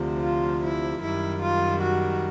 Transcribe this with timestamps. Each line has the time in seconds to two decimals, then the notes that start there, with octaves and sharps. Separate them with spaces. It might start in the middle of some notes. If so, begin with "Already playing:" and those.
Already playing: D2 C3 F3
0.23 F4
0.63 E4
1.02 F#2 D#3 G3 E4
1.43 F4
1.82 F#4